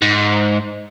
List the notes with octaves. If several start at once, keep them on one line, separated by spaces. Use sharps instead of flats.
G#2